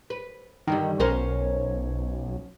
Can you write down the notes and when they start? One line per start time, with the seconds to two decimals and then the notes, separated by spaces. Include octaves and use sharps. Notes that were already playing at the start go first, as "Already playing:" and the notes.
0.10 B4
0.67 G2 D3 D#3 G3
1.00 B1 C#4 A#4 C5